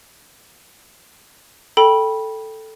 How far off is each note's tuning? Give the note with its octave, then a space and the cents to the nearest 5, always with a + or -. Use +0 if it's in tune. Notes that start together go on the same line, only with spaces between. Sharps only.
A4 +0 G5 +0 B5 -20